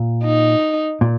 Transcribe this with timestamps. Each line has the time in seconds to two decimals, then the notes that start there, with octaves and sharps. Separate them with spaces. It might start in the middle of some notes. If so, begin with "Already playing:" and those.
Already playing: A#2
0.24 D#4
1.01 A#2